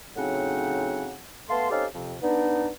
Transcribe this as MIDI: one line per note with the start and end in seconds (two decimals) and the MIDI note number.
0.16 1.15 45
0.16 1.15 49
0.16 1.15 54
0.16 1.15 60
0.16 1.15 63
0.16 1.15 78
1.49 1.70 57
1.49 1.70 59
1.49 1.70 77
1.49 1.70 81
1.49 1.70 84
1.70 1.85 60
1.70 1.85 61
1.70 1.85 63
1.70 1.85 67
1.70 1.85 69
1.70 1.85 77
1.93 2.15 41
1.93 2.15 48
2.21 2.67 59
2.21 2.67 62
2.21 2.67 63